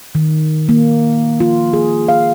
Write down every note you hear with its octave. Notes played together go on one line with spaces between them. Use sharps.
D#3
A#3
F4
G#4
F5